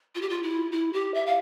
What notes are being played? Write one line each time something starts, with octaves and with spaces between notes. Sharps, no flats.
F4
G4
F4
E4
E4
G4
E5
F5